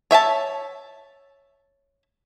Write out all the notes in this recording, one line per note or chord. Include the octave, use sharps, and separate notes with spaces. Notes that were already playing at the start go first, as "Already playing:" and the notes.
C#5 E5 G#5 A5